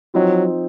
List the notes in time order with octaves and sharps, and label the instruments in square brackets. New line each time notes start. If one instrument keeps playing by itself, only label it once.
[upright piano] F3 C4 D#4 [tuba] F#3